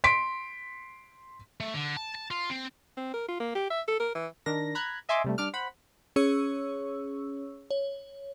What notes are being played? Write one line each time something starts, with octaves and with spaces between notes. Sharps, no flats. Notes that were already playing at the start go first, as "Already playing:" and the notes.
C6 B6 D7
A3
D3
A5
A5
F4
C4
C4
A#4
F4
A#3
G4
E5
A4
A#4
E3
D#3 D4 A#4 A#6
A#5 B5 F#6 G#6
D#5 E5 G#5 C6 D6
C3 G3 A3
G3 D4 D6 F6
C5 F#5 B5
C#4 G#4 C#5 C#6 E6
C#5